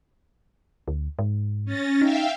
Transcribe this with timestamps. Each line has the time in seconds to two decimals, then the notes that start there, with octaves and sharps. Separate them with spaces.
0.88 D2
1.19 G#2
1.65 C#4 A6 A#6
2.01 D#4 E5 F5 G5